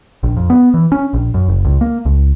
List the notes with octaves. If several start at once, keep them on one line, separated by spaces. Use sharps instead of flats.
A#1
F2
B3
E3
C#4
A#1
F#2
F#1
C#2
A#3
C#2